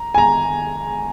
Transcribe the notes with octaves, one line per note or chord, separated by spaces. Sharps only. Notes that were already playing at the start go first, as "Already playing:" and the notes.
Already playing: A#5
G#5
A#5